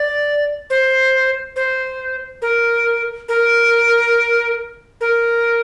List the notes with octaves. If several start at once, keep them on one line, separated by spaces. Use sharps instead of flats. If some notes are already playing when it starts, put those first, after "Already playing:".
Already playing: D5
C5
C5
A#4
A#4
A#4